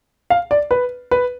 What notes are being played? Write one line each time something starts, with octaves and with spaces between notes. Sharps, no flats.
F5
D5
B4
B4